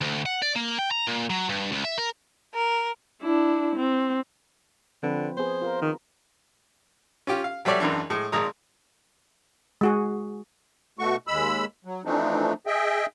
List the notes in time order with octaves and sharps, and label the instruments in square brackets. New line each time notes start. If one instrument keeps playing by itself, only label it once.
[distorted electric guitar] D2
F#5
D5
A#3
G5
A#5
A#2
F#3
G2
C#2
E5
A#4
[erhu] A#4
[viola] D4 E4
C4
[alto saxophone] D3 [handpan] F3 C4 B4
[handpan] B3 G#4 [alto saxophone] C5
[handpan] F4 A#4
[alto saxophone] D#3
[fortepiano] C#4 F4 G4
F5
F#3 G3 A4 C#5 D5 E5
G#1 F#2 E3 D4
A2 G#3
G#1 A#2 G#3 A#5 D#6
[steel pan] G#3 F#4 G#4
[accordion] B2 A3 F#4 C#6
D#2 G#3 B5 E6
F#3
E3 F3 A3 C4 D4 D#4
G#4 D#5 E5 G5